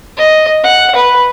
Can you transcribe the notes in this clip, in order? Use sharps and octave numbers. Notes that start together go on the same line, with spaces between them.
D#5
F#5
B4